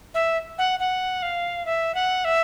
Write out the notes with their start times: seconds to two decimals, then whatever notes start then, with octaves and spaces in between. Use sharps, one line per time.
0.15 E5
0.58 F#5
0.80 F#5
1.23 F5
1.66 E5
1.95 F#5
2.25 E5